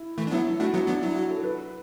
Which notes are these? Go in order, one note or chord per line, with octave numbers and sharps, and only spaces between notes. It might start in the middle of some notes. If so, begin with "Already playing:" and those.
Already playing: E4
E3 A3
D4
F#3 B3 E4
A3 D4 F#4
F#3 B3 F#4
F#3 B3 D4
F#3 E4
F#4
A4
B4